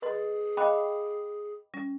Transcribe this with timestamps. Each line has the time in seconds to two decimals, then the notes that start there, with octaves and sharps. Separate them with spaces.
0.02 G#4 B4 D#5 C6
0.57 D#5 F5 G5 B5 D6 F#6
1.74 G3 C#4